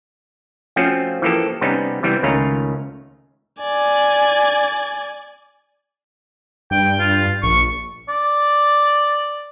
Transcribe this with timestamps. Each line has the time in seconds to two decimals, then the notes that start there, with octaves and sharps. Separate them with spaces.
0.76 F3 A3 C4 C#4 F4 F#4
1.22 E3 F3 A#3 G4 A4
1.61 C3 G3 B3 C#4 D#4
2.03 C3 E3 G3 B3 C4
2.23 C#2 D#3 A3 C#4 F4 A#5
3.60 D5 G#5
6.71 G2 G5
7.00 F4
7.43 A#1 C#6
8.09 D5